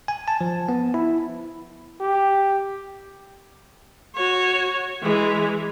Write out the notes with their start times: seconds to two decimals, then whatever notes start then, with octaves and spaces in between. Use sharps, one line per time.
0.08 G#5
0.28 A5
0.41 F3
0.69 B3
0.94 E4
2.00 G4
4.15 F#4 C#5
5.03 E3 G#3